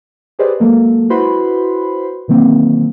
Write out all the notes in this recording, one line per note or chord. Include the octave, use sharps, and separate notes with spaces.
G4 G#4 B4 C5 D5 D#5
F#3 G#3 A#3 A4
E4 F#4 B4 C5 B5 C6
B2 D#3 E3 F#3 A#3 C4